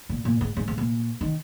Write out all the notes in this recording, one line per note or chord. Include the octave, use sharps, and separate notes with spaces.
A#2
A#2
G#2
G#2
G#2
A#2
D#3